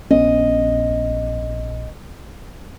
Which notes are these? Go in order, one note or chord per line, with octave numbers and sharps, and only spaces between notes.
A#1 B3 C#4 D#5